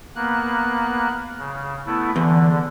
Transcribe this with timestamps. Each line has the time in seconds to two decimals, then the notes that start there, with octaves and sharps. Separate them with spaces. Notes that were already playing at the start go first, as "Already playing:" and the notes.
0.16 A#3 B3 F#6
1.38 C#3
1.86 A3 B3 E4
2.16 E2 D3